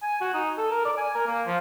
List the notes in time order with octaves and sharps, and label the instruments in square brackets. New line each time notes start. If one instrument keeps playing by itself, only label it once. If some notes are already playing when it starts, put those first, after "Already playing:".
[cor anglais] G#5
F#4
D#4
A4
A#4
D5
G#5
A#4
A#3
F3